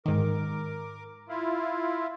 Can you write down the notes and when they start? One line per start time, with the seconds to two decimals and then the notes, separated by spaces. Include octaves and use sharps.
0.06 G#2 D#3 A#4 D6
1.29 E4 F4